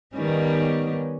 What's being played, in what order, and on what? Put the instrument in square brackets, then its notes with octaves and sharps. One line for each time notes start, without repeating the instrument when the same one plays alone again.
[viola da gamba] D#3 G3 D#4 [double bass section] B3 C#4